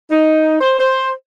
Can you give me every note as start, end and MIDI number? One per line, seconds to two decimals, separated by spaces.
0.10 0.57 63
0.60 0.75 72
0.79 1.11 72